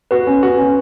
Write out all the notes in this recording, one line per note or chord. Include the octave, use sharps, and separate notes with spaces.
F#4 B4
C#4
F#4
C#4